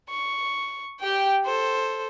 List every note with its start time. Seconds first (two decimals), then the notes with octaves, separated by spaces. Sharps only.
0.10 C#6
1.00 G4 G5
1.45 A4 C5